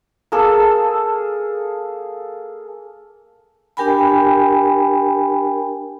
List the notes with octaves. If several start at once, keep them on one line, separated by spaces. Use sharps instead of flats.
A#3 G#4 A4 E6
D4 G4 A#4 G5 G#5 B5